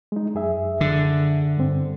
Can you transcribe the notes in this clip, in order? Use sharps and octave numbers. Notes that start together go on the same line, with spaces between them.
G#3 D#4
F#2 G#4 E5
D3
G2 C4